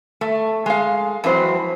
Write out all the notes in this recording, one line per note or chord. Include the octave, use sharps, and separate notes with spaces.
A3
G#3 F5
F2 E3 F#3 C5